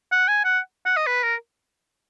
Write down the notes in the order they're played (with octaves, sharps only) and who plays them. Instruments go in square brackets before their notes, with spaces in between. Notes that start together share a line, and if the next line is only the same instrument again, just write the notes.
[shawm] F#5
G#5
F#5
F#5
D#5
B4
A#4